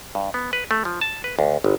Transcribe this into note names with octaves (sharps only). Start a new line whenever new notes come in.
G2
B3
B4
A3
F3
A5
B4
D2
G1